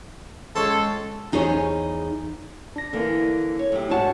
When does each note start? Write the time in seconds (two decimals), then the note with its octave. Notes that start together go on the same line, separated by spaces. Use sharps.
0.56 C#2 A4 C#5 C6
1.32 E2 D#4 G#4 C5 C#5
2.76 D4 A#6
2.93 D3 E3 A#3
3.59 C#5
3.72 A2 F#3 G4
3.90 G#2 D4 F#4 C#5 F#5 A5